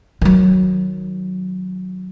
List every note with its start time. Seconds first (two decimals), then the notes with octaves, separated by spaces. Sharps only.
0.21 D#3 F#3